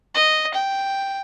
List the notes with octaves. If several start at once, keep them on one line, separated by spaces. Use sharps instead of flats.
D#5
G5